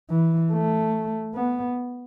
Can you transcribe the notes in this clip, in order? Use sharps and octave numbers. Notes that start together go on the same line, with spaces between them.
E3
A3
B3